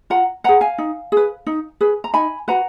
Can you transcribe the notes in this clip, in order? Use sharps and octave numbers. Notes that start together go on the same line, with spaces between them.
F4 F#5 A#5
G#4 B4 F#5 A#5
F5 G#5
D#4
G#4 B4
D#4
G#4 B4
A#5
D#4 G#5 B5
F#4 B4 F#5 A#5